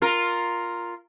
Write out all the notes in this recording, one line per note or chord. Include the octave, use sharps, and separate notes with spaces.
F4 A#4